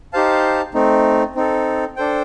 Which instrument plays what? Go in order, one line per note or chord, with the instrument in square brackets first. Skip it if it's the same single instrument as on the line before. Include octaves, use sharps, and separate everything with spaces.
[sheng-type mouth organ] D#4 G4 C5 F5 A5
A3 C4 D#4
C4 D#4 A4
D4 A4 C5 G5